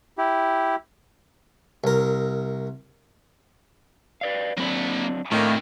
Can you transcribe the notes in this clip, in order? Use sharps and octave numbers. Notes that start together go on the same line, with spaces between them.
E4 G4
C2 A#4
B4 D5 F5
F#3 A#3 C4 D4 B5
A2 D#3 A#3 C4 D4